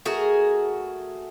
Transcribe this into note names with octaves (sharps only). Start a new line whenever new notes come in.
A3 F#4 G#4 A#4